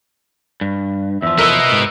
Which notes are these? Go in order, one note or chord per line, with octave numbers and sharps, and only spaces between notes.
G2
E2 F3 E5
A#4 B4 D#5 E6
G#2